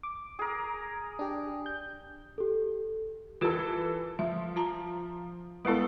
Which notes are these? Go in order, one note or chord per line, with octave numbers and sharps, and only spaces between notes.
D6
G#4 A#4
D4 G4
G6
G4 A4
E3 F4 G4 A4 A#4
F3 E5
F4 A5 A#5
G3 G#3 B3 E4 A4